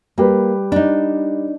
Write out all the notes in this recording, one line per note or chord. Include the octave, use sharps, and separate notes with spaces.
G3 A#3 G4 B4
D4 D#4